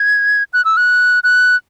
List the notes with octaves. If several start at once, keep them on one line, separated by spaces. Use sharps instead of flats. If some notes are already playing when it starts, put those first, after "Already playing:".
Already playing: G#6
F#6
E6
F#6
F#6